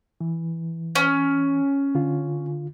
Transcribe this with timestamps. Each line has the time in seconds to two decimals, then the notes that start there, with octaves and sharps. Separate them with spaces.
0.21 E3
0.95 C#4
1.95 D3 F4